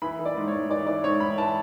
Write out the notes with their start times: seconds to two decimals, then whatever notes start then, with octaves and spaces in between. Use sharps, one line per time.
0.02 E3 B5
0.19 E3
0.25 D5
0.37 G#2
0.48 C#5
0.54 G#2
0.69 E3 D5
0.86 E3 D5
1.04 G#2 C#5
1.20 G#2 B5
1.38 E3 A5